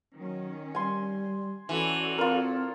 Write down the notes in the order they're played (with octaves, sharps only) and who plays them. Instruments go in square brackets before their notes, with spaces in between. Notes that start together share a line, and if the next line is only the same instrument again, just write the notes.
[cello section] D#3 C#4 [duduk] F#3
[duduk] G3 [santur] G#5 C6
[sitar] E3 [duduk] C#4 [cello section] F#4 A4 D5
[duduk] C4 [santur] F4 A#4